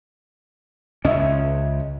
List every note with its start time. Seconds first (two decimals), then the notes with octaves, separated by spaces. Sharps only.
1.05 C#2 C#4 D#5 E5